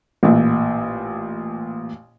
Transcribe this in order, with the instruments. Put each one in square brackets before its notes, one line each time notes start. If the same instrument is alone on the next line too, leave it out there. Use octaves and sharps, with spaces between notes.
[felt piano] A1 A#2